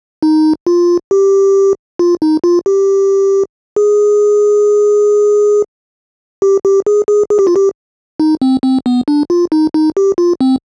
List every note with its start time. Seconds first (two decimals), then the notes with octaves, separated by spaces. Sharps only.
0.23 D#4
0.67 F4
1.11 G4
1.99 F4
2.22 D#4
2.44 F4
2.66 G4
3.76 G#4
6.42 G4
6.65 G4
6.86 G#4
7.08 G#4
7.30 G#4
7.39 G4
7.47 F4
7.56 G4
8.20 D#4
8.42 C4
8.63 C4
8.86 B3
9.08 D4
9.30 F4
9.52 D#4
9.74 D#4
9.97 G4
10.18 F4
10.41 C4